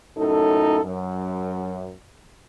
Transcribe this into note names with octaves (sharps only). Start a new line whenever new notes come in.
F#2 A2 D#4 A4
F#2